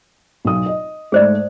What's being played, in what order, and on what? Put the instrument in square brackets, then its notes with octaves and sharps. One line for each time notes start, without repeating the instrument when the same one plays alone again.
[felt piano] B1 D#6
D#5
[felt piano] G#2 A3 [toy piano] G#4 C5 D5